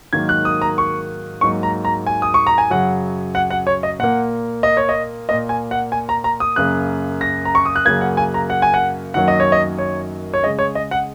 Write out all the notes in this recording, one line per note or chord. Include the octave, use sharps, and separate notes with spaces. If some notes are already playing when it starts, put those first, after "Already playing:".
G#2 D#3 F#3 A#3 G#6
F#6
D#6
A#5
C#6
G#2 F#3 A#3 C#6
A#5
A#5
G#5
D#6
C#6
A#5
G#5
F#2 C#3 F#3 F#5
F#5
F#5
C#5
D#5
A#2 A#3 F#5
D#5
C#5
D#5
A#2 A#3 D#5
G#5
F#5
G#5
A#5
A#5
D#6
F#2 C#3 A#3 F#6
A#6
A#5
C#6
D#6
F#6
F#2 C#3 F#3 A#3 G#6
F#5
G#5
A#5
F#5
G#5
F#5
F#2 D#3 F#3 A#3 F#5
D#5
C#5
D#5
C#5
C#5
C#3 G#3 D#5
C#5
D#5
F#5